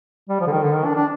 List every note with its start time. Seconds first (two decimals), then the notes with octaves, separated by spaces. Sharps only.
0.29 G3
0.40 F3
0.47 D3
0.51 D#3
0.62 D3
0.74 D#3
0.85 D4
0.95 D4